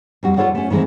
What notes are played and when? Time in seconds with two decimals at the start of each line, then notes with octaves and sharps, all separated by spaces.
0.23 F2 G3 F#4
0.37 F4 A4 C#5 D5 F#5
0.55 A3 C#4
0.70 D#3 E3 G#3 A3 C4